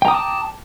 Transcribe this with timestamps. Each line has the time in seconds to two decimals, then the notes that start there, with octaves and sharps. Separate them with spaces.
0.02 G5
0.05 A#5
0.08 D#6
0.11 D6
0.14 A5